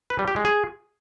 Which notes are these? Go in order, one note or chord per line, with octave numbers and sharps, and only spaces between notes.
B4
G3
G4
G#3
G#4